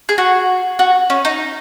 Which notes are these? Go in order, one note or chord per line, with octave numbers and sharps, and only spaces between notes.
G#4
F#4
F#4
C#4
D#4